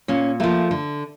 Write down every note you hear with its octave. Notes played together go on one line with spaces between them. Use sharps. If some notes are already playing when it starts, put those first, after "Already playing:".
A#2 C#4
F3 A3 A#3
D3